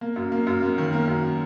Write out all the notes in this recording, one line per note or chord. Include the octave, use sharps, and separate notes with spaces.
A#3
F#2
A#3
F#2
A#3
D#3
A#3
F#2